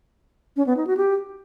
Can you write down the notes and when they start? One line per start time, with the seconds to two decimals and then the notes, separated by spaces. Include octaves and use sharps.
0.56 C#4
0.67 B3
0.77 D#4
0.87 F#4
0.97 G4